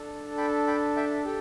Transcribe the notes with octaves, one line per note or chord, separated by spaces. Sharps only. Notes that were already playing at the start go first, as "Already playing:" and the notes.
Already playing: D4 A4
G5 B5
G5 B5
E5 G5
G4 A4